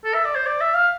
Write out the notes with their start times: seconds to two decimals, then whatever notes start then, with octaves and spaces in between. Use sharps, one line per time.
0.05 A4
0.14 E5
0.25 D5
0.35 C5
0.47 D5
0.61 E5
0.74 F5